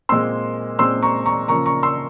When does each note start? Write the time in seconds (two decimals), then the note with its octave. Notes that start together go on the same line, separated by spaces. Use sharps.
0.09 A#2 G#3 C4 C6 E6
0.79 A#2 G#3 C4 C6 E6
1.03 A#5 C#6
1.26 A#5 C#6
1.48 C#3 F3 A#3 A#5 C#6
1.66 A#5 C#6
1.83 C6 E6